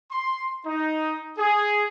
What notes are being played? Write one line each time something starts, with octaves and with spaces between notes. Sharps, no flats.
C6
D#4
G#4